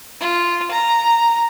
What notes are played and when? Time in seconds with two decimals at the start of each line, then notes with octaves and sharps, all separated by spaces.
0.20 F4
0.71 A#5